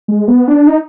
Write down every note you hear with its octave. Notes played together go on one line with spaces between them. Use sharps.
G#3
B3
D4
D#4